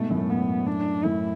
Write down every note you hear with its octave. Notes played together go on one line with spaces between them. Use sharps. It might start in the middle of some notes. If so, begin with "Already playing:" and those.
Already playing: G#2 B2 A3
F#2 A2
B3
D4
F#2 A2 E4